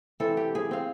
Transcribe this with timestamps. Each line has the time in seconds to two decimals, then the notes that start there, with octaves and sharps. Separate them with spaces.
0.20 E3 C4 A4
0.37 G4
0.55 G#4
0.71 C4 F5